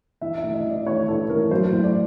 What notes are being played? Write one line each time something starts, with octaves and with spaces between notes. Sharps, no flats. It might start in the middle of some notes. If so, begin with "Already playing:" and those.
E3 E5
E5
A2
D#5
E3
D5
A2 C#5
E3 A4
A2 A#4
F#3 C5
A2
D5